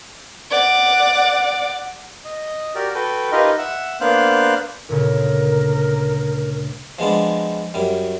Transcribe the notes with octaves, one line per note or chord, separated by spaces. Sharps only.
D5 F#5
D#5
F#4 G4 A#4 D5
F#4 A4 B4 G5
D#4 F4 G4 A#4 B4 D#5
E5 F#5
A#3 B3 D4 C5 F5 F#6
D2 A#2 C#3 A#4
F3 G#3 B3 D4
F#2 G3